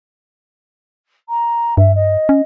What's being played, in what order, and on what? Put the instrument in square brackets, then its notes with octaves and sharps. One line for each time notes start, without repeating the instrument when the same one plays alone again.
[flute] A#5
[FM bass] G2 [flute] E5
[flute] D#5
[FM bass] C#4